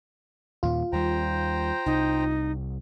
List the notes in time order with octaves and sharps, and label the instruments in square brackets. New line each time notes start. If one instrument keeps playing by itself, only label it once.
[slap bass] D#2 A#2 [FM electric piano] F4
[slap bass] D#2 G3 [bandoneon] C5 G5 A#5
[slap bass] C2 [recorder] D#4